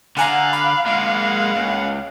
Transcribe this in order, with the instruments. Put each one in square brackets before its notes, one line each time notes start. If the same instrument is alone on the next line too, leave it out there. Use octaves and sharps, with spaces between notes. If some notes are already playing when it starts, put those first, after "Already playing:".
[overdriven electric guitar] D3 [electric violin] F5 F#6 [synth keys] F#5 G#5 A#5
[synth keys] B5
[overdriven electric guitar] G#3 A#3 [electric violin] F5 F#5
[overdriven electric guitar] C#2